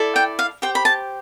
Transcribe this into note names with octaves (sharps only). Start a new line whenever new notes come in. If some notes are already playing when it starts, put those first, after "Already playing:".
Already playing: E4 A4 D5
G5
F5
G4 C5 G5
B5
A5